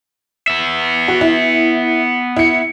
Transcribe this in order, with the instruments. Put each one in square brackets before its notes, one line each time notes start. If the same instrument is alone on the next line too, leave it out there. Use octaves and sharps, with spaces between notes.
[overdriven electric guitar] B3 E5
[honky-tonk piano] F#4
E4
E4 C#7